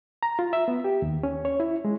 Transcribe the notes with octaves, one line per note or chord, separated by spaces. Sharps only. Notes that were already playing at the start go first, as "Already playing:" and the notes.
A#5
F4
E5
B3
G4
D#2
C#4
C#5
E4
G#3